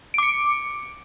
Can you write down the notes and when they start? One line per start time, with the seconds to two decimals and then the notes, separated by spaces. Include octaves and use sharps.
0.14 D7
0.18 D6
0.23 C#7